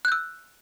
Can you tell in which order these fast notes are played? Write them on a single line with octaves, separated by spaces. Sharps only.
F#6 G6 E6